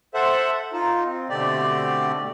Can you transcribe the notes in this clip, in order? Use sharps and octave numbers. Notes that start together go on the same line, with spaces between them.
A4 C5 E5 F#5
D#4 F4
C4
B2 D3 A3 C4 G4 D5